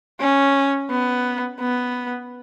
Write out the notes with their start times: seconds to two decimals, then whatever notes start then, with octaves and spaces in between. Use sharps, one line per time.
0.21 C#4
0.90 B3
1.60 B3